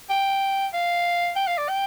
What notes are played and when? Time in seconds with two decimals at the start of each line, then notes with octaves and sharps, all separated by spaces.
0.10 G5
0.74 F5
1.36 G5
1.47 F5
1.58 D5
1.69 G5